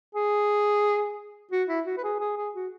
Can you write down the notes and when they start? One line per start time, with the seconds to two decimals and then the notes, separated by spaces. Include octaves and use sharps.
0.15 G#4
1.52 F#4
1.68 E4
1.86 F#4
1.98 B4
2.04 G#4
2.20 G#4
2.37 G#4
2.55 F#4